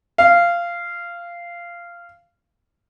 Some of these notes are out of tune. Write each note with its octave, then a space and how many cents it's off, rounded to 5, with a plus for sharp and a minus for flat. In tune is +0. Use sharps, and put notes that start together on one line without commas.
F5 -15